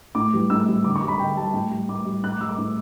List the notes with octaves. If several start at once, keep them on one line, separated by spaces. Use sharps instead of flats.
A2 D6
E3 G3
A2 E6
E3 G3
D3 D6
C#6
G3
B5
D3 G5
G3 A5
A2 G5
G3
A2 D6
G3
A2 F#6
D6
G3 E6
D6
A2